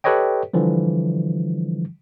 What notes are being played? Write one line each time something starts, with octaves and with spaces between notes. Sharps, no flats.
G4 A4 B4 C#5 D#5 G5
D3 E3 F3 G3